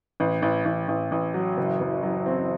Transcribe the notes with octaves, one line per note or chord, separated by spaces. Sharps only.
A1
A1
A1
A1
A1
F#3
F#1
F#1
F#3
C4